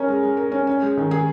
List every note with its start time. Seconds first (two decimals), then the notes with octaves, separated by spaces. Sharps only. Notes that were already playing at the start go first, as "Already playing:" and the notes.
Already playing: C#4 A#4
0.08 G#3
0.23 G#3
0.37 A#4
0.52 C#4
0.67 C#4
0.82 G#3
0.97 D#3
1.11 G#4